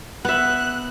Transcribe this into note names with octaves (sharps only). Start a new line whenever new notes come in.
B3 E5 F#6